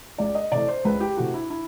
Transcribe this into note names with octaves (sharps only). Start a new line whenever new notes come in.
C#2 D5
D#5
C3 E3 A3 D5
C5
C#2 B4
G4
C3 E3 A3 F#4
E4
E4